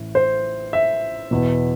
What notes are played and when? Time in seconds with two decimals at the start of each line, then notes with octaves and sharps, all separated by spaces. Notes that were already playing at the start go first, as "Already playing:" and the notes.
Already playing: A1 A2
0.15 C5
0.73 E5
1.31 E2 B2